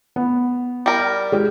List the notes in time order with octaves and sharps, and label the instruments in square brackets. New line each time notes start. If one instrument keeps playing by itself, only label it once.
[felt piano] B3
[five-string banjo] G3 A#4
[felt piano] G#3 G4